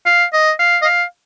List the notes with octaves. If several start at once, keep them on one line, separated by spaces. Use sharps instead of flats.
F5
D#5
F5
D#5
F5